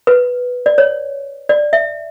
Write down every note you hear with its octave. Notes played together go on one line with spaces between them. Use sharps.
B4
D5
C#5
D5
E5